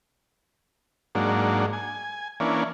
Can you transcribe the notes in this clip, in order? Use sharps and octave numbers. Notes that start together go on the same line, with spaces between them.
G#2 F#3 A#3 D4
G#5
E3 A#3 C#4 D4